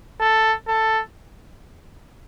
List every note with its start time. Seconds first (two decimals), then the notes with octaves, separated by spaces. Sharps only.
0.20 A4
0.68 A4